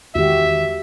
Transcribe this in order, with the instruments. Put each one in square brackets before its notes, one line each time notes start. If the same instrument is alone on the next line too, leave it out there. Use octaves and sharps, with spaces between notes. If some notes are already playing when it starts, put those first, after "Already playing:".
[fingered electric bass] E2 D#3 G#3 [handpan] F#4 G4 [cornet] E5